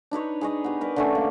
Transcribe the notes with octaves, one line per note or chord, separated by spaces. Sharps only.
D4 D#4 B4 C#5
G#4 C#5 D#5
B3 G4
A#4 B4 D5
D3 A3 C#4
A#3